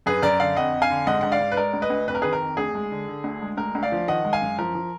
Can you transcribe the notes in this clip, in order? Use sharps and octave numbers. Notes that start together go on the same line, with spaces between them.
F#2 G#4 B4
F#2 A#4 D5
D3 D5 F5
F2 D#5 F#5
F2
F5 G#5
D3
G#2 D#5 F#5
G#2 F#5
D5 F5
G#2
B4
G#3 A#4 D5
D2
B4 D#5
D2
F2 B4
A#4
D#3 G#4 B4
A#4
F2
D2 G#4
G#3
D3
D3
D2
G#3
D2 A#4
D2
D5 F5
F3
D#3 D#5 F#5
G#3
F5 G#5
F#2
F3 A#4
F3